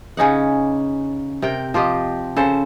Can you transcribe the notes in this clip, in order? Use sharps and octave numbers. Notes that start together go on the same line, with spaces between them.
C#3 C#4 D#4 F#5
C3 A#4 G5
F3 F4 G4 D#5
C#3 A4 C5